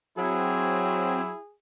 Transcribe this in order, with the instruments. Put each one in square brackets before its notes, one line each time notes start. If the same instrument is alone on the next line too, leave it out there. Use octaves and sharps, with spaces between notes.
[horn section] F#3 [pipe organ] C4 [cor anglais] E4 [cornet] G#4